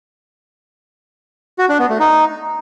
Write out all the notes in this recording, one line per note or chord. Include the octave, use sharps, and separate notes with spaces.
F#4
D4
B3
A3
D#4